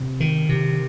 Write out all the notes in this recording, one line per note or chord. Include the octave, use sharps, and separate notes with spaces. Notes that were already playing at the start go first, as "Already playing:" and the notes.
Already playing: C3
D#3
C3